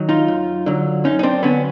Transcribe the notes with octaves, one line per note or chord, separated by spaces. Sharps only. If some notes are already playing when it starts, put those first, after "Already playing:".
Already playing: D#3 F#3
D#4 F4
F#2
D3 F#3
F#2 C#4 D#4
D#4
C4 D4
D3 F#3 B3 C#4